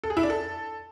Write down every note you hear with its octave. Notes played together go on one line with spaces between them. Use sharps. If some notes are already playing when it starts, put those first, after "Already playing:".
A4
G#4
E4
D4
A4